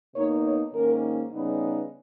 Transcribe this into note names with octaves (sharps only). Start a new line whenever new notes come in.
B2 A#3 D#4 C#5
C#5
G#2 D#3 A#3 C#4 A#4
C#3 G3 B3 D#4 B4
B4